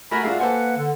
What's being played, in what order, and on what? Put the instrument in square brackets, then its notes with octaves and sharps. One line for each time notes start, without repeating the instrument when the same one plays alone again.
[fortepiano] A3 F#4 A#4 [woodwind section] G#5 A#5 B5
[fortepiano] G#3 D4 F#4 [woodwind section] F4 E5 F5
[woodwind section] A#3 B4 F#5 [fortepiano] A4 C5 G#5
[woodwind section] D3